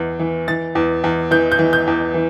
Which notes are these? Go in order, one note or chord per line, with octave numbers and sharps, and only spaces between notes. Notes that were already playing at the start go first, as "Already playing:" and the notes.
Already playing: E2 E3
E3
E3 A6
E2
E2
E3 G6
G6
E3
G6
E2
E3